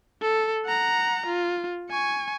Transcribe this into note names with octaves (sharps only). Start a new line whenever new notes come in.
A4
F#5 A#5
F4
G#5 C#6